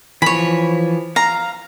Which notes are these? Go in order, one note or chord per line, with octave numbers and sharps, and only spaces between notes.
E3 F3 C#5 B5
F5 A#5